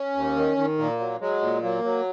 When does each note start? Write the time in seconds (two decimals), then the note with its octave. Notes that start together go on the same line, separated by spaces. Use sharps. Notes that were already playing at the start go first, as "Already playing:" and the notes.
Already playing: C#4
0.16 D#2
0.36 D#3
0.57 D#3
0.78 A#2 A#3
0.99 F#3
1.21 F#3 G#3
1.41 A#2
1.63 F#3 A#3
1.84 F#3